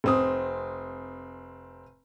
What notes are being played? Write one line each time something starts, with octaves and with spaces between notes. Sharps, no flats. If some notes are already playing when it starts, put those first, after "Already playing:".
F1 C4 D#6